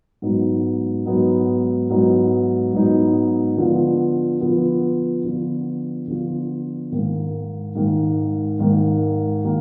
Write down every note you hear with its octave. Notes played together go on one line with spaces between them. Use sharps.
G#2 F#3 B3 D#4
G#2 F#3 B3 D#4
G#2 F#3 B3 D#4
G#2 F#3 B3 D#4
D3 F3 B3 F4
D3 F3 B3 F4
D3 F3 B3 F4
D3 F3 B3 F4
G#2 D#3 A#3
G#2 D#3 A#3
G#2 D#3 A#3
D#3 A#3